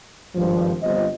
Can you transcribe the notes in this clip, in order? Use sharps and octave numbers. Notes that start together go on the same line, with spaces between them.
G#1 G2 F3
G1 F3 C4 D#5